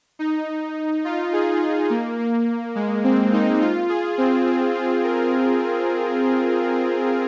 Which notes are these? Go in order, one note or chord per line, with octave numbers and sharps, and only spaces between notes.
D#4
F4
G#4
F4
A#3
A#3
G#3
C4
D#4
F4
G#4
C4
C4
F4
A#4